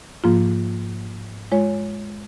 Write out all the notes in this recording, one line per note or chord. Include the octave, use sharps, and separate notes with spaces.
G#2 F3 A#3 F4
G#3 F4 C#5